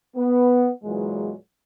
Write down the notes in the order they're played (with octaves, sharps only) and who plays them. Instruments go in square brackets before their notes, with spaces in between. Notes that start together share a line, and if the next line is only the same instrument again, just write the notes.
[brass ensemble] B3
E2 A#2 E3 F#3 G#3